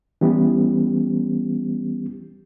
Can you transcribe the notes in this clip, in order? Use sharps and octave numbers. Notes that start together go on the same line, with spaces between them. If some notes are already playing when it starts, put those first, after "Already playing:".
E3 G3 B3 C#4 G4